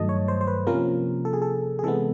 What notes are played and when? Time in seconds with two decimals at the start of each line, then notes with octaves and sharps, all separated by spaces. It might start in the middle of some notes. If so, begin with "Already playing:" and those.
Already playing: G2 D#3 F#3 A3 D#5 A5
0.09 C#5
0.28 C5
0.41 C5
0.47 B4
0.67 C3 F3 A#3 C#4 A#4
1.25 A4
1.33 G#4
1.42 A4
1.79 G#4
1.83 C3 E3 G#3 B3 A4